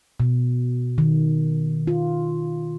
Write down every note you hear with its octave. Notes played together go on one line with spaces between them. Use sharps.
B2
D#3
F4